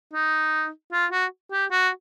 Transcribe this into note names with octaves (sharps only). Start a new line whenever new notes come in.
D#4
F4
F#4
G4
F#4